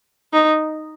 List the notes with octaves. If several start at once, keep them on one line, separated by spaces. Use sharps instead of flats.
D#4